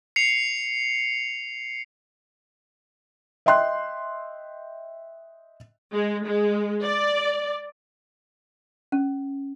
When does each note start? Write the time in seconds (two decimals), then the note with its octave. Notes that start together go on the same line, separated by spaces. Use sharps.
0.16 C7 C#7 F7
3.46 D#5 E5 G5 C6 F#6
5.94 G#3
6.24 G#3
6.84 D5
8.92 C#4